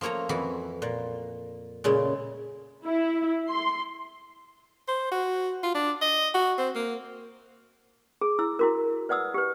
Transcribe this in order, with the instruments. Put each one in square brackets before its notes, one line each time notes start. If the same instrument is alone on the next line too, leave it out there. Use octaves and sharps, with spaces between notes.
[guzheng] F3 A3 A#3 C#5 A#5
F2 E3 F#4 B5
A#2
A#2 C#3 G#3 A3
[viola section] E4
C6
[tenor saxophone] C5
F#4
F4
D4
D#5
F#4
C4
A#3
[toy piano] G#4
E4 E6
E4 F#4 A#4
B4 D5 F#5 D#6 E6
G4 B4